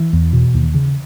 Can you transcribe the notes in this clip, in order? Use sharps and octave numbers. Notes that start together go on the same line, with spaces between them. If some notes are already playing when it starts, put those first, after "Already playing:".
Already playing: E3
E2
B2
D#2
C#3